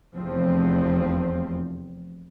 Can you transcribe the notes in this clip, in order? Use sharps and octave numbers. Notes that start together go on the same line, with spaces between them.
F1 E2 F3 C4